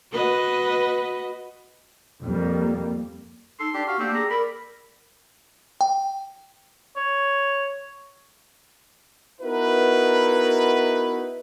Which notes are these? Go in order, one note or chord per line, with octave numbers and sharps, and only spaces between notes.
F#4 B4 D#5
F2 G3 A#3
D#4 A4 C6
D4 G4
F#4 G4 F5
A#3 C4 D4 G4 A4
G#4 A#5
A#4 D5 B5
G5
C#5
B3 D#4 E4 F#4 A#4 B4